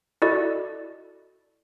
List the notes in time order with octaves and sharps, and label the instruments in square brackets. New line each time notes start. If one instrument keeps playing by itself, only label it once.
[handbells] E4 F#4 A4 D5 D#5